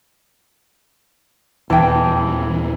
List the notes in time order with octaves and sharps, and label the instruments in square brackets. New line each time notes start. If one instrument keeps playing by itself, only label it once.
[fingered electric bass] D#1 E2 [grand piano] E3 [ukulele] G5 A5